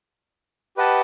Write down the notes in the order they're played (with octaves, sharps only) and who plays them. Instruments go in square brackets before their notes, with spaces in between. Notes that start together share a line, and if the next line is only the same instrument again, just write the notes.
[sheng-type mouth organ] G4 B4 D#5 F#5 A5